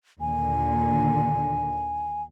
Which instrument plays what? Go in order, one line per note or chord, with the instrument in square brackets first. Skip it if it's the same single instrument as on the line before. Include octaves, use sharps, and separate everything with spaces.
[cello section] D#2 A#2 D3 [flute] G#5